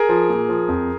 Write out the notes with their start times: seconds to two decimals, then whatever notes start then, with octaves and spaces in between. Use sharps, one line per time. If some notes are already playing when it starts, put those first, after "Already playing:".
Already playing: G#4 A#4
0.09 F3
0.30 A#2
0.49 F3
0.68 F2